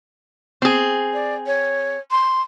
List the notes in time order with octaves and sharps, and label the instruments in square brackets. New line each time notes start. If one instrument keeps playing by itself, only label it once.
[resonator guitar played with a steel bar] C4 G#4
[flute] D5
C#5
C6